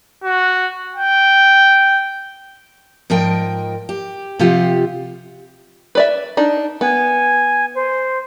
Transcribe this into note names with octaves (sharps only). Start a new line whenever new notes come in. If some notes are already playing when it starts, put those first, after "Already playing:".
F#4
G5
G#2 F3 A#4 D#5 G5
G4
C3 F3 F4 G4 F#5
B4 D5 E5
D4 D#4
B3 G#5
C5